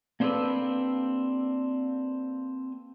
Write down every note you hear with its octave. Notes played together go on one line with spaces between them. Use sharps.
A#3 C4 D4 G4 A4 B4